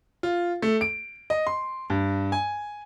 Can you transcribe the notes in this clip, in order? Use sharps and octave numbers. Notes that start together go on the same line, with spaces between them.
F4
A3
D7
D#5
C6
G2
G#5